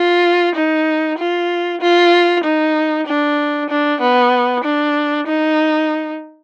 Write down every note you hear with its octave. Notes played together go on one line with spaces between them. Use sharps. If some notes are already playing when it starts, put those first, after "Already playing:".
Already playing: F4
D#4
F4
F4
D#4
D4
D4
B3
D4
D#4